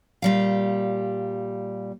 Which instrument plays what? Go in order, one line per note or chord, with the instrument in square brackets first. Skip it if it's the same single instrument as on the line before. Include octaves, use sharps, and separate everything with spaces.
[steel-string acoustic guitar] A#2 G3 F5